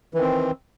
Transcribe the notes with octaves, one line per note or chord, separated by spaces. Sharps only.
D#3 E3 C4